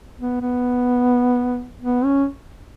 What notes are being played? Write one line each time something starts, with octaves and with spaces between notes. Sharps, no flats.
B3
B3
B3
C#4